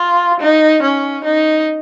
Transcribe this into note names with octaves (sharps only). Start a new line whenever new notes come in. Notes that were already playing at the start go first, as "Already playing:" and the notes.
Already playing: F4
D#4
C#4
D#4